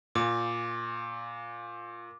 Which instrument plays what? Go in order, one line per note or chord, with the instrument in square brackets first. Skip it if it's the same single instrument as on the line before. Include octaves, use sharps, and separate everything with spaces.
[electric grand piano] A#2 [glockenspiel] D6